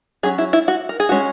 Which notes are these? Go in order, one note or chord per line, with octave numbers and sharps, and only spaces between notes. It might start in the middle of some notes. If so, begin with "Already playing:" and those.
F#3 C#4 G#4
E4
E4
F#4
A#4
G#4
G#3 C#4 F#4